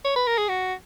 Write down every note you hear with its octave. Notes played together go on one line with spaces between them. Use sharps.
C#5
B4
A#4
G#4
F#4